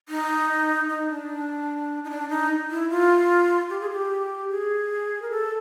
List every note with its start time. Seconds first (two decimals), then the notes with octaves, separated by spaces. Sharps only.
0.09 D#4
0.90 D#4
1.09 D4
2.04 D#4
2.10 D4
2.29 D#4
2.70 E4
2.90 F4
3.70 G4
3.81 G#4
3.91 G4
4.50 G#4
5.22 A#4
5.30 A4